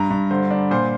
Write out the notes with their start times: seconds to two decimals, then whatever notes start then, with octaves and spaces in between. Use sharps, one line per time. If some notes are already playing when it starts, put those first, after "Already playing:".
Already playing: G2 A#5
0.10 G2
0.31 D3 C5
0.51 D4
0.71 A#2 C5